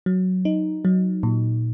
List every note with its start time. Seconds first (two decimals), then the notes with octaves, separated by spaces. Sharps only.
0.06 F#3
0.45 D#4
0.85 F#3
1.23 A#2